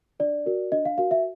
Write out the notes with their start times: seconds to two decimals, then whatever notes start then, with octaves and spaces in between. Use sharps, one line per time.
0.20 D4 D5
0.46 F#4 A#4
0.72 D4 D#5
0.85 F5
0.98 F#4 A#4 F5
1.11 E5